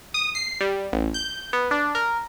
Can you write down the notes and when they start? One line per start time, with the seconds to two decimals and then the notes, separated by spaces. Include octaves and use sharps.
0.14 D#6
0.35 C7
0.61 G3
0.93 A1
1.14 G6
1.53 B3
1.71 D4
1.95 A#4